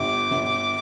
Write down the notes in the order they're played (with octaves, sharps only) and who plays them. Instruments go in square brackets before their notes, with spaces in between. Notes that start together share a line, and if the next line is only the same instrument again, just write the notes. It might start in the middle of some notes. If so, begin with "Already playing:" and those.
Already playing: [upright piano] G1 [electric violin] D6
[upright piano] G1